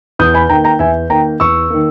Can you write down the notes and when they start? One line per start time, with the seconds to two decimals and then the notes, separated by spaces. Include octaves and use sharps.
0.19 E2 D#6 G6
0.34 G#5 B5
0.49 D#3 G5 A#5
0.53 A#3
0.64 G5 A#5
0.79 E2 E5 G#5
1.10 D#3 A#3 G5 A#5
1.40 E2 C#6 E6
1.70 D#3 A#3